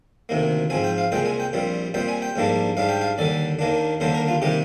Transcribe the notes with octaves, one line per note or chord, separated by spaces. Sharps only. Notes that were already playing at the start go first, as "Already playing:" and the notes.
D2 C3 D#3 A#3
G#2 F3 C4 G#5
G5
F5
C2 A#2 G#3 C4 G5
G#5
G5
A#1 A#2 G3 C4
A#2 G3 C4 G5
G#5
G5
A#1 G#2 G3 A#3 D4
G#2 G3 D4 F5
G5
F5
D#2 D3 G3 D5
D#2 D#3 A#3 D4
D#2 D3 G3 A#3 D4 C5
A#4
F4
C3 D#3 G3 A#3 G4